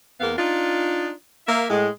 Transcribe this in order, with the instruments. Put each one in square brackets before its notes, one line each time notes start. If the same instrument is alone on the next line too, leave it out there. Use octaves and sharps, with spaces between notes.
[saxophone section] E2 G#3 A#3 B3 F5
D4 D#4 F4
A#3 E5
A2 G#3